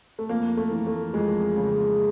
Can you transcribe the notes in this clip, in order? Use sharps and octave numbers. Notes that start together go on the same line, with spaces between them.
A3
F2 A#3
A3
E3
A3
F2 G#3
C#3